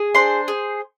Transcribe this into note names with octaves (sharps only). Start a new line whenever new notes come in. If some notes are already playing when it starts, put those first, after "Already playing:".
Already playing: G#4
D4 C5 C6
G#4